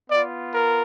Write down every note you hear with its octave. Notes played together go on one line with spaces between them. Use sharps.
B3 F4 D5
A#4